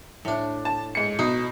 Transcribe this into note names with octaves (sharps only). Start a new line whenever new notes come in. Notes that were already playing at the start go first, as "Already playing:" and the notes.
A2 D4
A5
G#2 C#7
B2 D#4